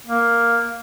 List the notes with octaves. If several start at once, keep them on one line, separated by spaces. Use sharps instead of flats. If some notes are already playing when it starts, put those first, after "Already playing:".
A#3